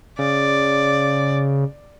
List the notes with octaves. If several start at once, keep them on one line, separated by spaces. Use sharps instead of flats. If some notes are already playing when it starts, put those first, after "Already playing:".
C#3 D5